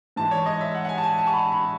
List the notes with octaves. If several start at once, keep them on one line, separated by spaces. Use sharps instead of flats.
G#2 E3 G#3 A5
C#5
D#5
E5
F#5
F#5
G#5
A5
G#5
A5
C#6
B5
B5